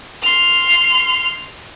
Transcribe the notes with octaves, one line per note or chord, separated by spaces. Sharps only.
C6 F6